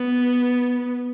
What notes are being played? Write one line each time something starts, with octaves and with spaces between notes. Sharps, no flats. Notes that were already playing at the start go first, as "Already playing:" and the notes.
Already playing: B3